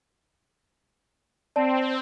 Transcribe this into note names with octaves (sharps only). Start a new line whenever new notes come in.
C4 D5 A5